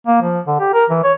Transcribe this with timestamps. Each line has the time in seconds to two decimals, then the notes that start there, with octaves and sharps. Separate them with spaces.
0.07 A#3
0.21 F3
0.47 D3
0.60 G4
0.74 A#4
0.90 E3
1.04 C#5